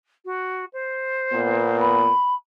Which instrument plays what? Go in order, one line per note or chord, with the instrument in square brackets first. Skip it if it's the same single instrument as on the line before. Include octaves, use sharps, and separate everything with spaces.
[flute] F#4
C5
[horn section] A#2 B3
[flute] B5